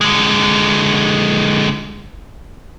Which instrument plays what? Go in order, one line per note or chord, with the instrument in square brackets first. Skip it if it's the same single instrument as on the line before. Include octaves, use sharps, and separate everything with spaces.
[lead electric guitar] D3 G#3